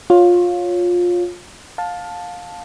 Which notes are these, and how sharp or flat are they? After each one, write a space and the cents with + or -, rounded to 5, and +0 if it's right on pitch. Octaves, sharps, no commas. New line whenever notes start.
F4 +20 C#5 +0
F5 +25 A5 +0